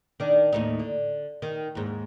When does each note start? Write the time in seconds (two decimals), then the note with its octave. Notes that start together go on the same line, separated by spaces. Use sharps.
0.20 D#3 D4
0.53 D#2 A2 D#4
0.80 D3
1.42 D#3
1.75 D#2 G#2